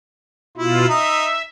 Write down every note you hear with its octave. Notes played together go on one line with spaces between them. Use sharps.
B2 E4 F4
D#4 E5